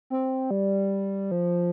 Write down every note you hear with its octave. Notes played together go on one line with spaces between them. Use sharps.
C4
G3
F3